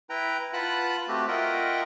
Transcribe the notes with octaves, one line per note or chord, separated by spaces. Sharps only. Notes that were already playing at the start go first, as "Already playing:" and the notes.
E4 B4 G5 A#5
F4 B4 F#5 A5 B5 F#6
A3 C4 F#4 G4
F4 A#4 D#5 E5 F#5 G5